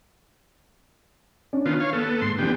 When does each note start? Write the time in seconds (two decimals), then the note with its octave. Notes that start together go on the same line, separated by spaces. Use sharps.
1.53 C#4 D4
1.66 D#3 B3 F4
1.80 C#5 F5
1.93 D#2 B3 A4
2.21 G#2 C6
2.39 F1 E2 D3 B3 G5